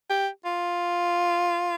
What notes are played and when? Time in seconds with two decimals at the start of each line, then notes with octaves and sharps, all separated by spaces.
0.10 G4
0.45 F4